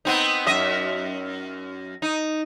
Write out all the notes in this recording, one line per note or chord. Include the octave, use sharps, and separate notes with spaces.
B3 C4 D#4
F#2 D#5 E5
D#4